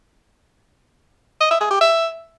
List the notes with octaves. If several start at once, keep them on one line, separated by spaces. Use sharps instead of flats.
D#5
E5
G#4
G4
E5